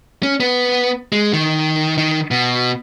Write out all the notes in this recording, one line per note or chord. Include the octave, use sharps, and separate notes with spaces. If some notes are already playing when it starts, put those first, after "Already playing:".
C#4
B3
G#3
D#3
D#3
B2